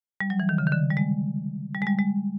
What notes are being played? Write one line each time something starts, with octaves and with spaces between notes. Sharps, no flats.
G3
F#3
E3
D#3
C#3
D#3
D3
G3
G#3
G3
G#3
G3
G#3